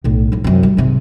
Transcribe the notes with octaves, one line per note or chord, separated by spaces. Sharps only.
B1 A2
A1 F3
C2 F#2
G3
G#1 C3